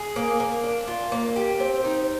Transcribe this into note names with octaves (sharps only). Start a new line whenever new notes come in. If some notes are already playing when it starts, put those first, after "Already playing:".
Already playing: G#4
A#3
A#3
D4
F4
A#3
G4
C4
D#4